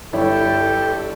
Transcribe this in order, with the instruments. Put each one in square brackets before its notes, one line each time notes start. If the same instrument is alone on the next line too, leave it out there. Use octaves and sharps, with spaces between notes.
[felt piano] G1 C#5 [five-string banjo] E4 [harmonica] G4 [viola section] A4